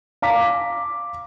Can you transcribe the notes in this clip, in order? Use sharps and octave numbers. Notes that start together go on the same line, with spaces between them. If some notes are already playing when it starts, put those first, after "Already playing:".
F5 A#5 D6 B6